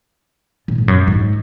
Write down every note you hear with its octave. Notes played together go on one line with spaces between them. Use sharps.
A#2
G#2
F#2
G#2